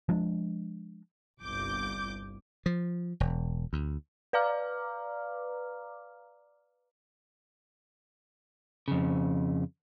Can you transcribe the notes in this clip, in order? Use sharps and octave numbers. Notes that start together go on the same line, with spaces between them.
F3 G#3 D4
G1 C2 D6 G6
F3
E1
D2
B4 D5 F5 A#5 D6 F6
F2 C#3